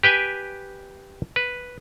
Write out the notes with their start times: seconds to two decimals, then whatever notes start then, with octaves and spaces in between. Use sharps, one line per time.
0.03 G4 B4 G5 G#5
1.36 B4